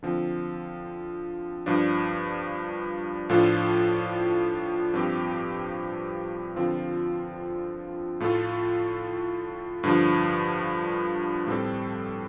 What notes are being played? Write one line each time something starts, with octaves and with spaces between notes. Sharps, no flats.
D3 F3 C4
G2 F3 D4
A2 F3 D4 F4 A4
G2 F3 C4 G4
D3 F3 C4 F4
A2 A3 F4 A4
G2 D3 F3
A2 G3 C4 A4